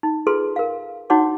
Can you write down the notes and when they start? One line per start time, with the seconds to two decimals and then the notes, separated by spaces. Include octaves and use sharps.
0.03 D#4
0.27 F4 G#4 A4 B4 C6
0.56 A#4 F5
1.10 D4 D#4 F#4 C#5 F#5 D6